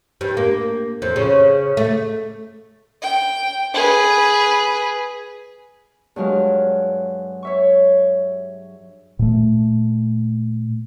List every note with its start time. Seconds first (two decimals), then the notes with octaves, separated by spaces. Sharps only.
0.21 G2
0.37 A#3
1.02 F2
1.16 C#3
1.77 A3
3.02 G5
3.74 G#4 B4
6.16 G2 F#3 G#3 F5
7.43 C#5 E5 C#6
9.19 A#2 A3